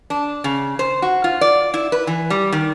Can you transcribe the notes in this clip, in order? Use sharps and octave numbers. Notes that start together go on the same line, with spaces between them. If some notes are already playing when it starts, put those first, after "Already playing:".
D4
C#3
C5
F#4
F4
D5
E4
B4
E3
G3
D#3